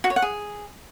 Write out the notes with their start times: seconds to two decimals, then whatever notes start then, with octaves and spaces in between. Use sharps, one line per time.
0.04 F#4
0.10 C#5
0.16 F#5
0.22 G#4